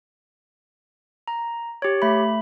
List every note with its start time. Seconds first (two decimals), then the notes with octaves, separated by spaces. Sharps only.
1.28 A#5
1.82 G4 C#5
2.02 A3 B5